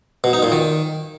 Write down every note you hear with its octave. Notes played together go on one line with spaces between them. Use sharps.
B2
D#4
A#2
D#3